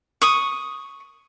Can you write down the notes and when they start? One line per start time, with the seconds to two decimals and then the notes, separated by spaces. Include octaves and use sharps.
0.22 C#6 D#6